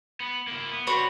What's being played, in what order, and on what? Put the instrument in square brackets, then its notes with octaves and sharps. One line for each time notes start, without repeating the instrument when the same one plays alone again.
[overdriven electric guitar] B3
A#3 E4
B3
[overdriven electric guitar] G3 C4 [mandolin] F#4 B4 C#5